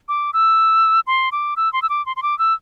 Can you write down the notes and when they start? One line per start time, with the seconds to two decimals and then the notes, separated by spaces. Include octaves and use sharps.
0.09 D6
0.33 E6
1.07 C6
1.32 D6
1.57 E6
1.73 C6
1.82 E6
1.90 D6
2.06 C6
2.16 C6
2.23 D6
2.39 E6